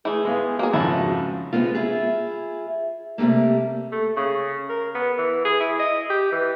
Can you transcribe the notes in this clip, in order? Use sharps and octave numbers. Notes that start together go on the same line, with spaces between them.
E3 A3 G#4
G#3 B3 F5
A#3 F#4 G#4
F2 G#2 C#3 E4 B4
E3 G#3 B3 C4 F4
E4 F4 G#4
C3 F3 G3 A3 A#3
A3
C#3
A#4
B3
E3
G#4
E4
D#5
G4
E3